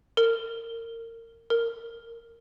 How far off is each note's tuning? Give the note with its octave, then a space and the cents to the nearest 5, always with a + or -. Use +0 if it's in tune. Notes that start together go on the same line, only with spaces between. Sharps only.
A#4 -30
A#4 -15